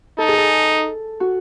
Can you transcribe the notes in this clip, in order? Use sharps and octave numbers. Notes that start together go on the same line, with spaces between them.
D#4 A4
G#4
A4
F#4